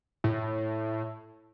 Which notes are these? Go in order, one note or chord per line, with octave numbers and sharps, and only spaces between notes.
A2